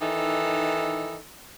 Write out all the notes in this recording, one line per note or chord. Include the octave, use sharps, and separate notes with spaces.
D#3 E3 D#4 A4